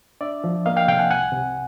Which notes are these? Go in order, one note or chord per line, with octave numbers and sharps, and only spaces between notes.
D4 D5 E5
F3
A#3 D#5 F5
F5 G5
C3 F5 G5
F#5 G#5
C2 F#5 G#5
C3